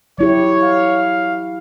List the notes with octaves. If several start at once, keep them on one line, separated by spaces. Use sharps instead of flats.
F#3 E4 G4 C#5
F5